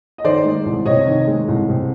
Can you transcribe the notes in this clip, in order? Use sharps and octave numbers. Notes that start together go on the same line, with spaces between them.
D#5
D#3 C5 D5
G#3
C2
C3 C#5 D#5
D#3
G#3
C2
C3